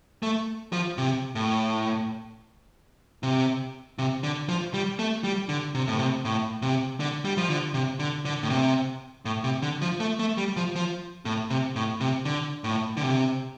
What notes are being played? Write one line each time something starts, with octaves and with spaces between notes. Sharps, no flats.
A3
F3
C3
A2
C3
C3
D3
F3
G3
A3
G3
D3
C3
A2
C3
A2
C3
D3
G3
F3
D3
C3
D3
D3
A2
C3
A2
C3
D3
F3
A3
A3
G3
F3
F3
A2
C3
A2
C3
D3
A2
D3
C3